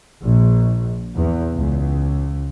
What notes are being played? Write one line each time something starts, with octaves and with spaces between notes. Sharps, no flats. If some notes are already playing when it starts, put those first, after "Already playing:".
A#1
E2
C#2